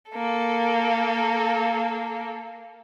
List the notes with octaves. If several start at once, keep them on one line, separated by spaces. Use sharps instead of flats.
A#3 A4